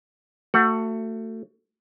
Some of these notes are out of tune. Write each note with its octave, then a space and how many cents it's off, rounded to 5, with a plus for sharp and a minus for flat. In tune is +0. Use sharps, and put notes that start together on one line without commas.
A3 +25 F#4 +0 F#5 +0